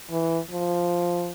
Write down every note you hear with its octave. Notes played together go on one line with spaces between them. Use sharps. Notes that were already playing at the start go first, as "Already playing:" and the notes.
E3
F3